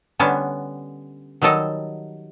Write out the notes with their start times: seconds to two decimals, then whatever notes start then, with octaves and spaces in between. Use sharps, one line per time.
0.19 D3 G3 B3 C#4 D4 A5
1.42 D#3 F#3 G3 A4 D#5